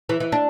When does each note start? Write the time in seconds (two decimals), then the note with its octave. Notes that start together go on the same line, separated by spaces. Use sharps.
0.09 E3
0.20 E3
0.32 D4